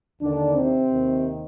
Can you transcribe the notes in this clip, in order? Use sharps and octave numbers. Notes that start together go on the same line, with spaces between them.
D#2 D3 D#3 D4
C3 C4
D#2 D#3